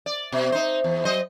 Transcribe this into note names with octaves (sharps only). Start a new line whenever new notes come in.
D5
B2
D#4 C5
E2
F#3 C5 D#5